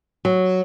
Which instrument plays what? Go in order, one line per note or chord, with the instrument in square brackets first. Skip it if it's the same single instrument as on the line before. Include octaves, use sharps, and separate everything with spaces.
[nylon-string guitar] F#3